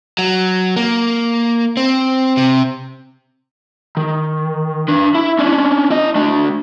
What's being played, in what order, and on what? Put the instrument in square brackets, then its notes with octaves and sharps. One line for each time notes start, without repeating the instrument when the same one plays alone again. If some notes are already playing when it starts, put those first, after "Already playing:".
[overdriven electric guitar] F#3
A#3
C4
C3
[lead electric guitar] D#3
D4 B4
E4
C#4 D4
E4 D#5
A3 D4